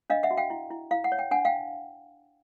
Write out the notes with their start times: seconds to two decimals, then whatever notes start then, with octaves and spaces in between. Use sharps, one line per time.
0.10 D4 D#5 F5
0.23 E5 F#5
0.31 F#4
0.37 F5 G5
0.50 E4
0.71 E4
0.91 E4 F5
1.04 F#5
1.12 C#5
1.19 G5
1.31 D4 F#5 G#5
1.45 F5 G5